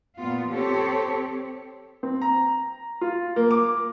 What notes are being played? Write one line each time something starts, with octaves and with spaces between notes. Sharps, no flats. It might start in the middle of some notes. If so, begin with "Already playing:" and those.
A#2 B3 F4
C4 G4 A4 C#5
C4
A#5
F4
A#3
D6